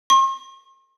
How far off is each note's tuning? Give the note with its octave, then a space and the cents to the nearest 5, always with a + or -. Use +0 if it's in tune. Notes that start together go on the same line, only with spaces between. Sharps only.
C6 +45